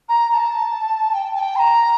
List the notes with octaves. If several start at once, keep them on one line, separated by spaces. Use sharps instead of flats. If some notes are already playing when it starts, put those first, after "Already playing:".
A#5
A#5
A5
G5
A5
G5
C6
A#5